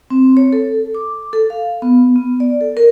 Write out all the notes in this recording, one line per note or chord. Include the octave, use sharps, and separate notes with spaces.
C4
C#5
A4
D6
A4
F5
B3
B3
D5
A4
A#4